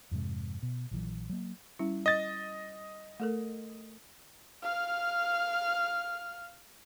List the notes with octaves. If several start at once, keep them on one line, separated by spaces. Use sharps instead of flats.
F2 G#2 C3 G#3
B2
A#1 E3 F#3
F#3 A#3
G3 C#4 E4
D#5 A6
A3 A4 A#4
F5 F6